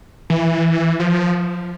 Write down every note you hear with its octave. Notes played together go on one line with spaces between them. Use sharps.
E3
F3